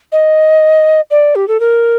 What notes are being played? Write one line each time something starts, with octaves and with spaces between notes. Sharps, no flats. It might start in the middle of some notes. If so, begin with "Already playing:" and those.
D#5
D5
G4
A4
A#4